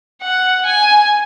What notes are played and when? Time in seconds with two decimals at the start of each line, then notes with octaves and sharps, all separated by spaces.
0.22 F#5
0.65 G#5